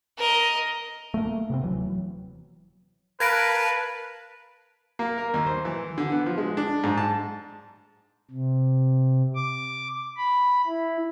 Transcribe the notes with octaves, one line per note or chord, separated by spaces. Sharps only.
A#4 D#5
A3 A#3
C3 B3 C4
D#1 E3 F#3
A#4 B4 F5 A5 G#6 A#6 D7
A#3
A#4
D#2
C5
E3
D3
B3
F3
G#3
D4
G#2
A5
C3
D6
B5
E4